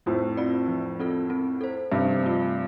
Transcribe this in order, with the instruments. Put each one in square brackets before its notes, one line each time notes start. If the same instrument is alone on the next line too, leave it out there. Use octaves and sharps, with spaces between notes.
[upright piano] F2 A2 [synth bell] F3
[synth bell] C4 F4 D5
F3
C4 F4 A4
C4
A4 C5
[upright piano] G2 C3 [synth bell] F3
[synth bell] A3 F4